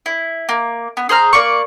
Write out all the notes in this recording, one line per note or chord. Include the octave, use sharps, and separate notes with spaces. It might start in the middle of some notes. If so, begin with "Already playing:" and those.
E4
A#3
B3
G#4 C5 A#5 F6
A#3 D5 C#6